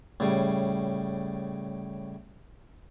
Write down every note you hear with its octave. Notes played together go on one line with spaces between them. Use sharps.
A2 C#3 G3